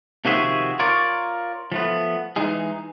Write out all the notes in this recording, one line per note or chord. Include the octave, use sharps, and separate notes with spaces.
C3 D#3 F3 F#4 G#4 E5
F4 A#4 C#5 D5
F3 A3 B3
E3 G#3 D#4 G#4